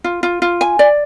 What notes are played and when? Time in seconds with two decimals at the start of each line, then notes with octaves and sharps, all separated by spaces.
0.04 F4
0.23 F4
0.42 F4
0.61 G#5
0.79 D5